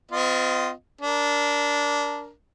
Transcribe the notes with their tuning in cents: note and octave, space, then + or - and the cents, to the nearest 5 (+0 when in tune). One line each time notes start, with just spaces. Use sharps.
C4 -45 F4 +0 D#5 +0
D4 -15 A#4 +0